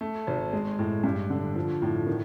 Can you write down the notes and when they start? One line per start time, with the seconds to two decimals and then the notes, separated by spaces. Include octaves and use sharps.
0.01 A3
0.27 G#1
0.53 G#3
0.79 A2
1.04 G2
1.30 D3
1.56 F3
1.82 A2
2.07 D#3